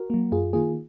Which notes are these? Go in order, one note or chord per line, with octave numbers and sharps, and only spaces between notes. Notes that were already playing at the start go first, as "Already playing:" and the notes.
Already playing: F#4 A#4
F#3 A#3
F#2 F4 G#4
D#3 A#3 F4 G#4